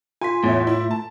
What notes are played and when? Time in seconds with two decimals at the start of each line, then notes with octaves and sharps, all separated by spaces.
0.21 F4 G#5 C6 B6
0.44 E2 A2 C#5 E5
0.67 E4
0.91 A5